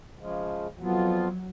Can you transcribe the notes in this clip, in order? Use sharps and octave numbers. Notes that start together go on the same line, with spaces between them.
C#3 F3 G#3
F2 F3 F#3 B3 F4